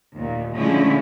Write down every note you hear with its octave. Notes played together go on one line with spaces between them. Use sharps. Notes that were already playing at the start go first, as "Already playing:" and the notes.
D#2 A#2
D3 F3 G#3 A3 C#4 E4